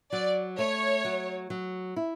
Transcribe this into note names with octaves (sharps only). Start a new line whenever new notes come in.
F#3 D5
A3 C#5
F#3
F#3
E4